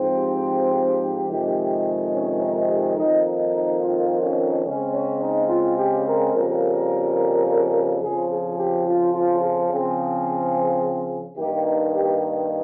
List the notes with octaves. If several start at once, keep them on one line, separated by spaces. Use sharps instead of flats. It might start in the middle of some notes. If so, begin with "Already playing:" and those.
Already playing: G#2 F3 C4
G4
F2 C3 D#3 G#3
C#4
D#4
G4
F2 D#3 A#3 D#4
D#4
D#4
F4
C#4
C#3 G#3 C4 C#4
C#4
D#4
F4
G4
A#4
F2 C#3 G3 A#3 A#4
F2 C#3 F3 G#4
G#4
G4
F4
F4
G#4
C#3 F3 C4 G#4
G2 D#3 A#3 G4
D#4
G4